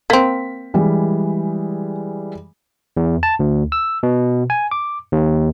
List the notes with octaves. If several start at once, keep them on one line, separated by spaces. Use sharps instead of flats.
A#3 C4 B6
E3 G3 G#3
E2
A5
D2
E6
B2
G#5
D6
D#2